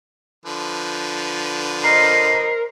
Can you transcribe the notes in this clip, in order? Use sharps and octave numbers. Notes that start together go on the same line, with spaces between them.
D3 F3 B4
A#4 C5 D#5 C7